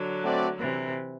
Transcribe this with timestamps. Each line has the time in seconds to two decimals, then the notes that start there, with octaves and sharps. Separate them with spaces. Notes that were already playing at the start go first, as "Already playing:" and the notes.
Already playing: D3 F#3
0.24 A3 C4 F#4 B4 D5
0.58 C3 E3